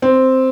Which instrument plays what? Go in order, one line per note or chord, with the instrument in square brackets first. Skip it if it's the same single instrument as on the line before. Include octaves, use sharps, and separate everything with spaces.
[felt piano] C4